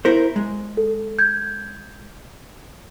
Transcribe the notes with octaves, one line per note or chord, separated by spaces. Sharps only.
E4 A#4 C5
G#3
A4
G6 G#6